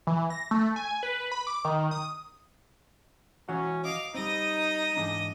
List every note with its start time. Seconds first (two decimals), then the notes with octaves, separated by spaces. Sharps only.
0.07 E3
0.30 A#6
0.51 A3
0.76 G#5
1.03 B4
1.32 B5
1.47 D6
1.65 D#3
1.91 D#6
3.49 E3 C#4 F#4 F#5
3.84 D#5 F5 D6
4.15 G3 C4 D#4 D#5 D#6
4.97 G#2 E3 D4